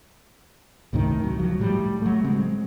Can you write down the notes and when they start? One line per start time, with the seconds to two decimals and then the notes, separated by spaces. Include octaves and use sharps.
0.93 C#2 A2 C3 D#3
1.24 F#3
1.39 F3 F#3
1.59 A2 G3
2.02 F#3 A3
2.24 C#3 G#3 C4